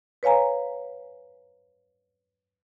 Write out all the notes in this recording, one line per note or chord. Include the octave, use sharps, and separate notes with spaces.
B4 C#5 F5 G#5 A#5